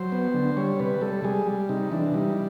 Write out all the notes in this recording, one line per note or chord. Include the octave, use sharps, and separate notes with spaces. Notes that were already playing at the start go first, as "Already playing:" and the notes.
Already playing: F#3 C5
B3
D3
G3 C#5
C3 B4
G3 A4
G3 G#4
G3
C3 D#4
E3 D4
G3 D#4